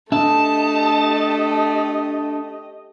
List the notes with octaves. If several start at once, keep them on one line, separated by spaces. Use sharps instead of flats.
A3 D4 G4 D#5 E5 A5